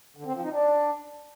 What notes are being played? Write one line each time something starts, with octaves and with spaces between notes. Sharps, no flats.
D3
C4
F3
D#4
D4